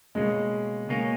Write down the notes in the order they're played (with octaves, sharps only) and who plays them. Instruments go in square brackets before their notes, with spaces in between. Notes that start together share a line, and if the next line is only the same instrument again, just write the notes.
[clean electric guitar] C#2 B2 A#3 C#4 [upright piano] G#3
[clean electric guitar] C#2 B2 A#3 C#4